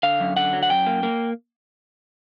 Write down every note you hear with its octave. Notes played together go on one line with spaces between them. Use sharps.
D3 F5
F#2
D3 F#5
F#3
F#5
F#2 G5
A#3
A#3